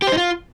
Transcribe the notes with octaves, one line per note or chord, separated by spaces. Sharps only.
G4
C5
D#4
F4